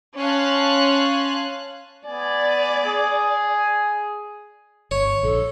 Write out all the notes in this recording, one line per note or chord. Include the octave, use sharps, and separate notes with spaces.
C#4 C#5 F5 A5 C6 F#6
B3 D5 G#5
G#4
G1 C#5
A#1 A4